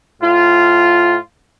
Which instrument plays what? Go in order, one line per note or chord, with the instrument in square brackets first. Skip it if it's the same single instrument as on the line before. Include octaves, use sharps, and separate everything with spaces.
[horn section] A2 F4